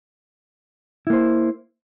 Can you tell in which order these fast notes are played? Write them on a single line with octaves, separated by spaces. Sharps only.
E4 A#3 C5